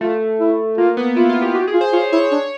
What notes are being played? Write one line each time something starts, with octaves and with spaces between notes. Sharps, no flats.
A3 F4
E4
A#3 F4
B3
E4 F4
F4
G4
F#4 G4
G#4
F4
C5
F4 C#5
E4 C#5
D4 C#5